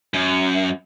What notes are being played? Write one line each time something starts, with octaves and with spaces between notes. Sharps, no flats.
F#2